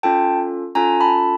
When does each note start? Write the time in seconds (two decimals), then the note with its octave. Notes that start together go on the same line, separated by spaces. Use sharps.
0.03 C#4 F4 A4 G5 A5
0.75 C#4 F4 A4 G#5 A#5
1.01 A5 B5